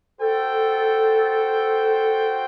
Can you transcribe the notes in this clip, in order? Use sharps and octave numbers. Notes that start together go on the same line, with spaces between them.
F#4 A4 C5 G5